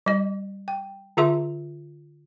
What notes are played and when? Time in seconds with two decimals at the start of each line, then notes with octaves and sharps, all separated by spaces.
0.06 G3 D#5
0.68 G5
1.17 D3 F4 G#4 E5 C6